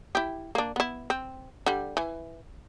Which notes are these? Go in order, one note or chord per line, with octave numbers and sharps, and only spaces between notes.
E4 G4
A#3 D4
B3 E4
C4
D3 G3
E3